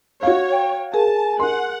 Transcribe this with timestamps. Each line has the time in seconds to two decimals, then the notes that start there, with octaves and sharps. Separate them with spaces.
0.23 F#4 C#5 F5
0.52 G5
0.94 G#4 A#4 G#5 A5
1.40 A#4 F#5 C6